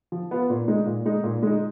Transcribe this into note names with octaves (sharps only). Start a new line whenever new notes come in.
F3
B3 F4
A#2
G#3 D#4
A#2
G#3 D#4
A#2
G#3 D#4